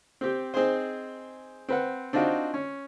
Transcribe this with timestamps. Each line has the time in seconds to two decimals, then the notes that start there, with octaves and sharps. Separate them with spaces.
0.21 C4 G4
0.54 C4 D#4 G#4 C5
1.69 C4 B4 F#5
2.13 C4 D4 D#4 F4 F#4
2.54 C#4